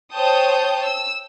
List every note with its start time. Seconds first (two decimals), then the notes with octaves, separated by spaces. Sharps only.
0.13 C5 C#5 G5 A5 D#6 G6
0.83 E6